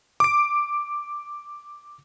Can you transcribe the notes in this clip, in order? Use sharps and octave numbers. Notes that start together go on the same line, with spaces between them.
D6 D7